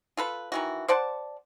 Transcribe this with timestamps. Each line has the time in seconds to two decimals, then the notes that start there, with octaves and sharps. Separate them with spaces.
0.17 F4 A4 B4
0.52 D#3 E3 F#4
0.88 C5 D5 F#5 A5